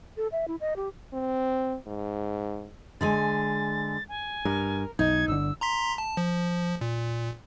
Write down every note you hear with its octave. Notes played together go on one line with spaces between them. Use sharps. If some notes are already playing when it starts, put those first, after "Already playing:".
A4
E5
E4
D#5
G4
C4
G#2
D3 G#3 G#5 A6
G#5
G2 A#4
B1 D#4 G#6
G1 D3 E6
A#5 C6 B6
A5
F3
A#2